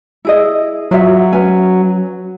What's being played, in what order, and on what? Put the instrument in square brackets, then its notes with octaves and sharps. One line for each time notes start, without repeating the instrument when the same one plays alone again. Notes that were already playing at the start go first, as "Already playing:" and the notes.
[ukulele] E4 G#4 D#5
[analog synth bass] F#3 [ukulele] F4 F#4 E5
[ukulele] C#4 B4 G#5